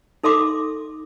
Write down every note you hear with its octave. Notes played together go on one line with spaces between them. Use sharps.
D#4 A4 E5 C6 D6